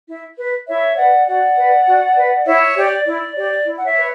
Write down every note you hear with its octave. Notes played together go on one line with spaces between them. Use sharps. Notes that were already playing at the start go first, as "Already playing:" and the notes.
E4
B4
E4 C#5 E5
B4 D5 F#5
F#4 D5 F#5
B4
F#4
B4
E4 C#5 E5
G4 C#5 D5
E4 D5
G4 C#5 D5
E4
F#5
C#5 E5
B4